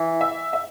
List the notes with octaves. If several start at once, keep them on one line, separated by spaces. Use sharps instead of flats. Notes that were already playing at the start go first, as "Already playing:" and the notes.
Already playing: E3
E5
E5